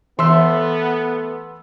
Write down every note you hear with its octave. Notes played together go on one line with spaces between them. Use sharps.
E3 A3 B3 C6 E6